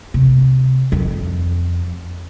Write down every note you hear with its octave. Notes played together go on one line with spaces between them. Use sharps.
C3
F2